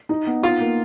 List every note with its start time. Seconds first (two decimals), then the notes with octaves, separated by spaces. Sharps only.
0.09 D#4
0.27 B3
0.43 D#4 F4
0.60 A#3